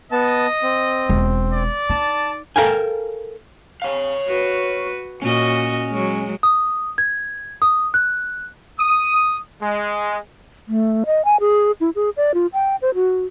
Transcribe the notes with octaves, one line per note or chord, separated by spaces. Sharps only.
B3 D#5 A5
C4
E1
D5
D#4 A5
A4 A#4 F5 G5 G#5
C#5 F5
F#4 B4
A#2 C#4 F#4 D#5
F#3 G#3
D#6
G#6
D#6
F#6
D#6
G#3
A3
D#5
G#5
G#4
E4
G#4
D5
F4
G5
C5
F#4